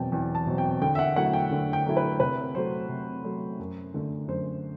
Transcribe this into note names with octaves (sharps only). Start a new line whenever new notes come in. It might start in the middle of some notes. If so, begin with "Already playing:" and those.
Already playing: E2 B2 F#3 C4 G5 A5
E2 G5
A5
B2 F#3 C4
G5
D3 G5
E5
F#5
F#3 A3 E4 F#5
G5
D3
G5
F#3 A3 E4
B4
C3 B4
F#3 A3 C5
C3
F#3 A3
F#2
D3 A3
F#2 C5